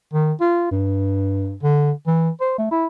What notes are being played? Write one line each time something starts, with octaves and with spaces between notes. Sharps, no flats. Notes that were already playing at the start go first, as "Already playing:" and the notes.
D#3
F4
G2
D3
E3
C5
A3
E4